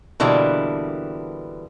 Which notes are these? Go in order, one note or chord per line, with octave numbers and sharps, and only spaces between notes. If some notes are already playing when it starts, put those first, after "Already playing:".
B2 D3 E3 G3 A#3